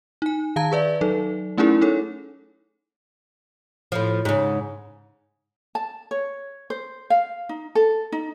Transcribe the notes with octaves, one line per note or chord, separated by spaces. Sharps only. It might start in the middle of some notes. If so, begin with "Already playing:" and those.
D#4 G#5
D#3 F5 A5 A#5 G#6
G#4 B4 D5 E5
F#3 D#4 A4
A3 C#4 D#4 E4 G#4 A#4
D#4 A4 C#5
A2 F3
G#2 C#3
A5
C#5
C5
F5
D#4
A4
D#4